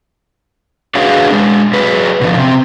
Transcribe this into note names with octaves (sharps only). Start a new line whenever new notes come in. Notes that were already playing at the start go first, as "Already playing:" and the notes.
D4 F#4 G#4 B4 C#5 F5
G#3 D4
F#3 G#4 B4
B2 D3 F3
C3 C4